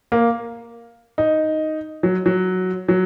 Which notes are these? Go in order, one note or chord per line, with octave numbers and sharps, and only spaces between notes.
A#3
D#4
F#3
F#3
F#3